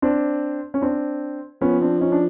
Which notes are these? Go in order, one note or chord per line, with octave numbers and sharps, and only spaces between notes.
C4 D4
C#4
C4 D4
F3 B3 C#4
C4 D4
C#4 D#4
D4